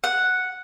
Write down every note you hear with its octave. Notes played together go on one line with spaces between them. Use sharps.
F#5